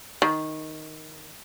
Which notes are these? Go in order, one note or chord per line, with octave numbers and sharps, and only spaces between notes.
D#3